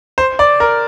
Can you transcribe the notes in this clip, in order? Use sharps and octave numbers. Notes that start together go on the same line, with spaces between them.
C5
D5
A#4